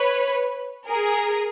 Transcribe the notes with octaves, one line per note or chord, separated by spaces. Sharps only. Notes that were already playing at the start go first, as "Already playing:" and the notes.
Already playing: B4 C#5
G#4 A#4